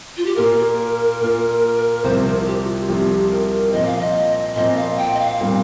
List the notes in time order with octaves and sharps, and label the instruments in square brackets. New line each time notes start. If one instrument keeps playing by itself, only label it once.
[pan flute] F4
G4
[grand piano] A#2 A#3 F4 [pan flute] A#4
[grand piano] A#2 A#3 F4
[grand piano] C2 C3 F3 [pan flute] C5
[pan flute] A#4
F4
G4
G4
F4
[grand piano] C2 C3 F3 [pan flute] G4
[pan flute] A#4
[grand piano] A#2 F3 C4 [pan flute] D#5
[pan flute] F5
D#5
[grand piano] A#2 F3 C4 [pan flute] D#5
[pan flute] F5
G5
D#5
F5
[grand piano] A#2 G3 C4